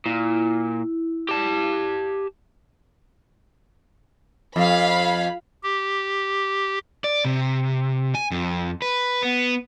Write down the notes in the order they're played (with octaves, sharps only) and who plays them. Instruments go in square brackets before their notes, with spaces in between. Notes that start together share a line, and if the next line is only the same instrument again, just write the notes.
[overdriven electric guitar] A#2 [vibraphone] E4
[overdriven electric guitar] G4 A5
[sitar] F2 [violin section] F5 B5
[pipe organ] G4
[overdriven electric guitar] D5
C3
G#5
F2
B4
B3